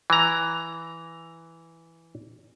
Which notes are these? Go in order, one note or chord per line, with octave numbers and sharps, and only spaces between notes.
E3 A#5